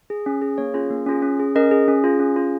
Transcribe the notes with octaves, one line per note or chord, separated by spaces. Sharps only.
G#4
C#4
G#4
A#3 C#5
C#4 F4 G#4
A#3
C#4 F4 G#4
C#4
G#4
C#4 A#4 D#5
G#4
C#4
F4 G#4
C#4
F4 G#4